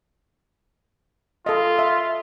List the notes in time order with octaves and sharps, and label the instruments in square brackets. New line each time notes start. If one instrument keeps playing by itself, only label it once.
[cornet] F4 [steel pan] A4 D#5
[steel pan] E5